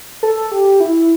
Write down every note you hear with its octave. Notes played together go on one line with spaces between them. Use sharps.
A4
G4
E4